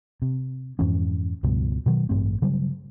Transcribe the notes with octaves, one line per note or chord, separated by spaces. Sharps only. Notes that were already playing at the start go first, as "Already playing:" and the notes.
C3
F2 G#2 E3 C#4
C#2 G2 B2 F3
B2 D#3 F#3
A1 G2 A3 C4
C#3 F#3 G3